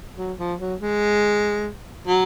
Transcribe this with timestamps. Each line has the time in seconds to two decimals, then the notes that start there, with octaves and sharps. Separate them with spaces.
0.18 F#3
0.39 F3
0.60 F#3
0.80 G#3
2.07 F#3